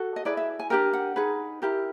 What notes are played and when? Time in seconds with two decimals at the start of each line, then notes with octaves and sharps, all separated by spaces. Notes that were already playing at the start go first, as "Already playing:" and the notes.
Already playing: F#4 A4
0.16 D#5
0.25 E4 G#4 B4 D5
0.37 E5
0.59 G#5
0.70 D4 G4 A#4 G5
0.93 F#5
1.16 D#4 G#4 B4
1.62 E4 G4 A#4